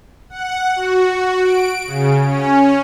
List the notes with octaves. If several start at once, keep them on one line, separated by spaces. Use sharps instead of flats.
F#5
F#4
D7
C#3
C#4